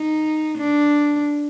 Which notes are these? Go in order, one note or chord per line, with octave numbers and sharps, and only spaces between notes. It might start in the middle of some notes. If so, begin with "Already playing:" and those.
Already playing: D#4
D4